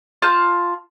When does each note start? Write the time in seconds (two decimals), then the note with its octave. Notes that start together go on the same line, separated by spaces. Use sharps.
0.22 F4 A5 G6